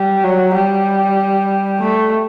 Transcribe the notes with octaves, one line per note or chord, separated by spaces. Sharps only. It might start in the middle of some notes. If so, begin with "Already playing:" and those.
Already playing: G3
F#3
G3
A3